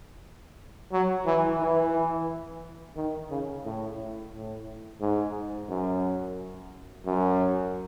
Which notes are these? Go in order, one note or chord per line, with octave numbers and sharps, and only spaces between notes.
F#3
E3
E3
D#3
C#3
A2
A2
G#2
F#2
F#2